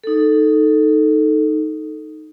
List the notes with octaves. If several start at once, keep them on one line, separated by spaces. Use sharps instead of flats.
D#4 A4